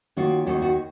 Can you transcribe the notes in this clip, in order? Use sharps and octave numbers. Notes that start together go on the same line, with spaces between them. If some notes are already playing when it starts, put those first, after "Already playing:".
D#3 A#3 C#4 F4 F#4
D#2 D#3 A#3 D#4 F#4
F#4